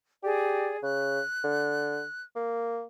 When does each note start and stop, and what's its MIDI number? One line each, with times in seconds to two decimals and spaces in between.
0.23 0.72 67
0.23 0.77 68
0.23 0.77 74
0.82 1.20 49
0.82 2.22 90
1.44 2.02 50
2.36 2.84 58